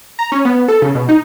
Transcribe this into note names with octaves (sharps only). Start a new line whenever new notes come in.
A#5
C#4
B3
A4
C#3
B2
D#4